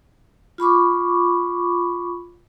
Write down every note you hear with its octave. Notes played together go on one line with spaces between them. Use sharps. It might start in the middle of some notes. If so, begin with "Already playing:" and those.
F4 B5 C#6 D6